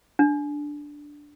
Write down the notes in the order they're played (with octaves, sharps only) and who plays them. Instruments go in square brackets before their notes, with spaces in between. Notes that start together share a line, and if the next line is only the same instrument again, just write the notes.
[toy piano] D4